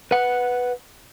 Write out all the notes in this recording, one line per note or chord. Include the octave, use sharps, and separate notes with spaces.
B4 F#5